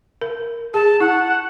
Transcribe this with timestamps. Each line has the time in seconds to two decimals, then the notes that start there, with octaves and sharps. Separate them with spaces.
0.21 A#4
0.74 G#4 A5
1.00 E4 F#5